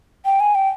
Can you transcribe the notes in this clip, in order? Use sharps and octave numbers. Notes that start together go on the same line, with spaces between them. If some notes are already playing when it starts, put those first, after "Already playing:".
G5
G#5
G5